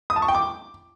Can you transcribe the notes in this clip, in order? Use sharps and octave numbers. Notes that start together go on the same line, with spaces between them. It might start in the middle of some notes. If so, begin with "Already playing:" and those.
D#6
A5
C#6
G5
D6